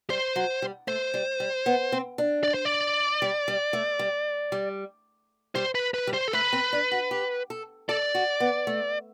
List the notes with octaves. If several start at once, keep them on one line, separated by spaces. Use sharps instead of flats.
G3 C5
F#3
G3
A3 C5
G3
G3
B3
C4
D4
D5
C5
D5
G3
G3
A3
G3
G3
G3 C5
B4
B4
G3
C5
A4
A3 B4
C4
D4
F#4
G4
A4
A4 D5
F#4
B3
A3